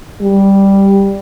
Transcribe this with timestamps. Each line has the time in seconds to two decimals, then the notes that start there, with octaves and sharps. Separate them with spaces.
0.22 G3